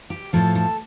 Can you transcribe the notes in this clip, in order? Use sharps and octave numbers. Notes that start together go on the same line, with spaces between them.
G4
A2 F3 A4
A4